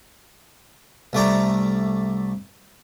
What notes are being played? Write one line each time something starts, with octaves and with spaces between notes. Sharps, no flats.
C2 A3 D5 A#5